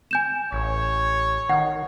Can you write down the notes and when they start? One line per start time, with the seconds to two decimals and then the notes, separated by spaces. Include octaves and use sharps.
0.11 G#5 G6 E7
0.53 A1 C#5
1.49 D#3 F#5